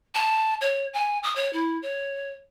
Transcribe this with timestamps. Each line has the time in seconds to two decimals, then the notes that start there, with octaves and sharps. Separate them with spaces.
0.15 A5
0.61 C#5
0.93 G#5
1.23 D#6
1.35 C#5
1.53 E4
1.82 C#5